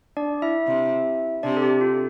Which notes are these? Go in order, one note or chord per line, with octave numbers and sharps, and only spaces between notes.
D4 D5
E4 E5
C3
C3 D4 D5
A4
G4
F4